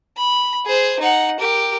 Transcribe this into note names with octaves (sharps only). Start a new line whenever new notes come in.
B5
G#4 C5
D#4 F#5
G4 A#4